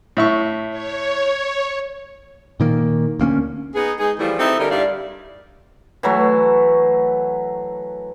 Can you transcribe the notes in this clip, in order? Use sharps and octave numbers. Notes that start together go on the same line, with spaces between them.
A2 E5 C#6
C#5
A#2 D#3 A#3
D2 A#3 C4 C#4
B3 D#4 G#4
G#3 D#4 G#4
E3 F3 G3 A3 E4
C4 D#4 E4 G4 A4
D3 G3 D#4 E4 A#4
G2 G3 E4 D5 F5
E3 F#3 A3